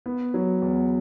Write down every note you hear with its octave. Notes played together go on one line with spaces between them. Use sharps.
B3
F#3
E2